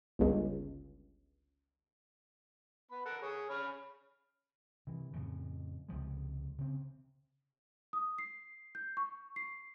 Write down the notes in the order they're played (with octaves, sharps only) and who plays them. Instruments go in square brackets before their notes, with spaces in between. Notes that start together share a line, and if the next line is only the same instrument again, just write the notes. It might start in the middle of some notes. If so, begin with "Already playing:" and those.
[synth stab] G1 C#2
[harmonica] B3 B5
A4 A#4 F#5
G#4 C#5
C#4 B5 F6
[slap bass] C3 E3
F2 A2 C#3
C#2 C3 F3 G#3
C#3 C4
[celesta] D#6
C7
G6
C#6
C7